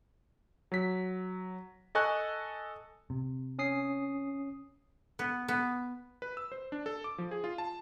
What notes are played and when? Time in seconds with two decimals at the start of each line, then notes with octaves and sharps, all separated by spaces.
0.72 F#3 B6
1.95 A4 D#5 G#5 A5 C#6 F#6
3.10 C3
3.59 C#4 D#6 C7
5.19 B3
5.48 B3
6.22 B4
6.37 E6
6.52 C5
6.72 D4
6.86 A4
7.04 D6
7.18 F3
7.31 G#4
7.44 F4
7.58 A5